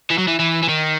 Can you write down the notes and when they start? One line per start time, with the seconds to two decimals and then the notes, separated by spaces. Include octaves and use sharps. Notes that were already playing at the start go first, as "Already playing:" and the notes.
0.10 E3
0.18 F#3
0.28 E3
0.39 E3
0.63 E3
0.69 D#3